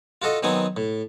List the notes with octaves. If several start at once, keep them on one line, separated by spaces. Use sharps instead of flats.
F4 F#4 A4 D#5
D#3 F#3 B3 C4 G#5 D#6
A2